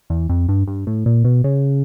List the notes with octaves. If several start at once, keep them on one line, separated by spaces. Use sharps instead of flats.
E2
F2
G2
G2
A2
A#2
B2
C#3